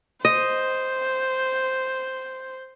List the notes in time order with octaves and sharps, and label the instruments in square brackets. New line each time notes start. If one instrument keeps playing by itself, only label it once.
[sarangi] C5 [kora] D#5